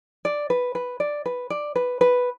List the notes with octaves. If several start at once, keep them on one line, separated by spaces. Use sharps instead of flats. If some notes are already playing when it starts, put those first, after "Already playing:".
D5
B4
B4
D5
B4
D5
B4
B4